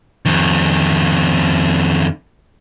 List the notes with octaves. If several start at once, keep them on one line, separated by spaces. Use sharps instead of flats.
F2 D#3